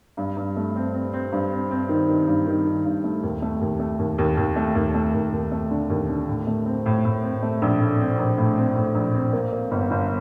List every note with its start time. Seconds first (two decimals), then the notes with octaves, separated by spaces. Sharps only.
0.17 G2
0.37 G2
0.57 A3
0.76 C4
0.94 C4
1.13 C4
1.32 G2
1.51 C4
1.71 C4
1.89 D#3
2.09 D#3
2.28 G2
2.47 D#3
2.65 D#3
2.85 G2
3.04 A3
3.23 D#2
3.42 A3
3.61 D#2
3.80 A3
3.99 D#2
4.18 D#2
4.37 D#2
4.56 A3
4.75 D#2
4.94 A3
5.14 D#2
5.32 D#2
5.52 A3
5.71 D3
5.90 D#2
6.09 D3
6.28 A2
6.47 A3
6.66 C4
6.86 A2
7.05 A2
7.23 C4
7.42 A3
7.62 A#1
7.80 A2
8.00 C4
8.19 A#1
8.38 A2
8.57 C4
8.76 A2
8.95 A#1
9.14 C4
9.33 A#3
9.53 A#3
9.71 G1
9.91 G1